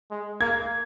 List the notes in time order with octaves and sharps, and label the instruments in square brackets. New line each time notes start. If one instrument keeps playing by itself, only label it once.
[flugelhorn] G#3
[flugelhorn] A#3 [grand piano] G#6